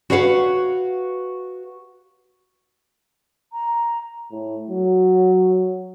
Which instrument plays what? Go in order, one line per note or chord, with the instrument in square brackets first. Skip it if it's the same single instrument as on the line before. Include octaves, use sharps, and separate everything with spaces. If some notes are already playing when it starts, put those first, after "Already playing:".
[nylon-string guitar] F#4 B4 C#5 F5 F#5
[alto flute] A#5
[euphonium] A2
F#3